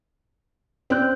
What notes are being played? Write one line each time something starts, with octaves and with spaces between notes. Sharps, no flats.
C4 C#4 C5 D5 F#6 G6